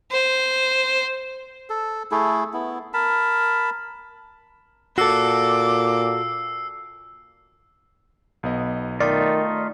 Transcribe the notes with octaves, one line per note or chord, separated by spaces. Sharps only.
C5
A4
A3 E4 G#4 A4
B3 E4
A#4 A5 B5
A#2 F#4 A4 D6 E6 C7
B1 B3 D#5
D#3 A3 D#4 F4 D5